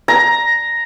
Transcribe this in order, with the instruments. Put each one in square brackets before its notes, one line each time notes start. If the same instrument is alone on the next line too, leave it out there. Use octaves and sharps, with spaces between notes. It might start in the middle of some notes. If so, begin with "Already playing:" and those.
[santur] A#5